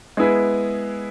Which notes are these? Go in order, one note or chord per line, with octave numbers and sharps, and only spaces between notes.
G#3 B3 E4 G#4 B4